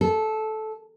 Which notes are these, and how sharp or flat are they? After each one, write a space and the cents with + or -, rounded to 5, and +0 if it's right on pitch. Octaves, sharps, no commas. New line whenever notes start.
A4 -15